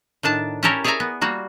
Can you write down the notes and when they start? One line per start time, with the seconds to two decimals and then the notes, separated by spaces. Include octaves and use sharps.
0.23 A2 D#3 D4 A5
0.63 C#4 E4 G4 A4 A#4 C#5
0.84 G#4 C#5 D5 E5 G#5 A#5
1.00 B3
1.21 G3 A#3 F#4